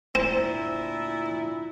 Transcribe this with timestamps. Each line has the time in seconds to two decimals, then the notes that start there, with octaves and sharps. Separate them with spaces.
0.15 D2 A#2 C4 E4